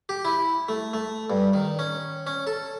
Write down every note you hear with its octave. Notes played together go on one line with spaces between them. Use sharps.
G4
E4
A3
A3
G2
D#3
C#4
C#4
A4